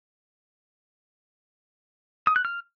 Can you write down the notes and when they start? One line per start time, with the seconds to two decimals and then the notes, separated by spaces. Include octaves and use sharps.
2.27 D#6
2.36 F#6
2.45 F6